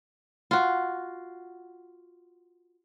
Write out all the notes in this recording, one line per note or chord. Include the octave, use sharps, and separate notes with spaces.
F4 F#4